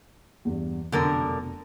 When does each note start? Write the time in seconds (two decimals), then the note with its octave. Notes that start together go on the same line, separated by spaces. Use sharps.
0.45 E2 G2
0.92 F1 F#2 B2 D3 A#4 A#5